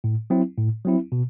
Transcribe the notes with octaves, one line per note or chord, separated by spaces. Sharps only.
A2
F#3 C4 E4
A2
F#3 C4 E4
B2